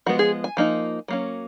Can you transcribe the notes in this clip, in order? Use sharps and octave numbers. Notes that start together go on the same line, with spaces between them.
F3 G#3 B3 F#4
G#4
G#5
F3 A#3 D#4
F#3 A#3 C#4